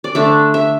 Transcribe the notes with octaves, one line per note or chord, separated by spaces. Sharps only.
D5
D3 A3 D4 E5
E5